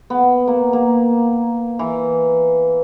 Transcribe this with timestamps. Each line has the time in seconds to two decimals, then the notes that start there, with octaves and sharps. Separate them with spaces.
0.10 B3
0.47 A#3
0.73 A#3
1.79 E3